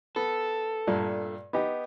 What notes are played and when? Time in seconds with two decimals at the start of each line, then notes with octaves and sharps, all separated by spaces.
0.16 B3 A4
0.87 G2 A#2 A3
1.53 B3 D#4 G4